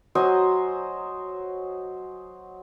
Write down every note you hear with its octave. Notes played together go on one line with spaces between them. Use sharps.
F#3 C5 D#5 G#5